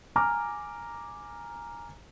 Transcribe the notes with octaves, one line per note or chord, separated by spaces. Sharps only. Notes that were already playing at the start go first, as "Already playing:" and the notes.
G#5 A#5 D6 F6